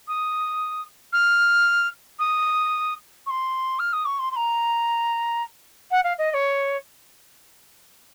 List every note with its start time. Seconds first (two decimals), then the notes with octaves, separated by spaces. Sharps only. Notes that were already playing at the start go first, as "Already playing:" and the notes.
0.08 D#6
1.13 F6
2.20 D#6
3.26 C#6
3.30 C6
3.79 F6
3.93 D#6
4.06 C#6
4.19 C6
4.32 C6
4.36 A#5
5.91 F#5
6.04 F5
6.18 D#5
6.31 D#5
6.34 C#5